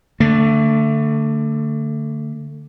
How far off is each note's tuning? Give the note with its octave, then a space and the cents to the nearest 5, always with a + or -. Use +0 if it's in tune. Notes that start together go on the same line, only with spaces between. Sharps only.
D3 +0 A3 +25